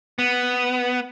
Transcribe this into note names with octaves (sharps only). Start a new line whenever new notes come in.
B3